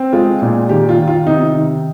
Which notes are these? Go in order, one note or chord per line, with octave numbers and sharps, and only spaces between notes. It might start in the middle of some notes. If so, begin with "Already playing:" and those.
Already playing: C4
G#3 F4
A#2
D#3 G4
F4
D#3
F4
C3 D#4
D#3